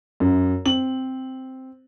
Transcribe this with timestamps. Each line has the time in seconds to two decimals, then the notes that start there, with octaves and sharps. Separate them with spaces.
0.20 F#2
0.65 C4 F#7